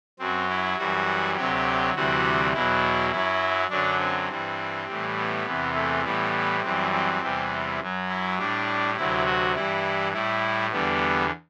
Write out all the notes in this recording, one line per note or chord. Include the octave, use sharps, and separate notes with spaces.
F#2 F#3 C4
E4
F#2 E3 G3 F#4
D2 C3 F#3 G4
D2 C3 E3 G3 F#4
E2 B2 F#3 E4
F#2 F#3 E4
F#2 D3 F#3 D4
C4
G2 E3 G3
A2 E3 G3
B3
E2 C3 E3
A3
A2 E3 G3 B3
F#2 E3 G3 C4
C4
E2 C3 E3 G3
F#2 F#3
E4
A2 G3 D4
D2 C3 F#3 E4
F#4
G2 E3 G3 E4
A2 G3 E4
E2 D3 G3 B3